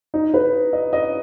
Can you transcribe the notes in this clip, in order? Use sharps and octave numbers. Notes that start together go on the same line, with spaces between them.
D#4
B4
D#5
D#5